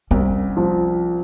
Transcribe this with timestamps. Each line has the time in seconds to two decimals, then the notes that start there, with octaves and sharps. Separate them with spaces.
0.11 C2 C#4
0.57 F3